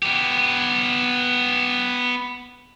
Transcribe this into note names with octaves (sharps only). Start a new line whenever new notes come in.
B3 G4